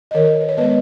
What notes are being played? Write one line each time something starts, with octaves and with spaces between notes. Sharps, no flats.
D#5
D#3 A#4 C#5
B4
C#5
G#3 B3 B4 D#5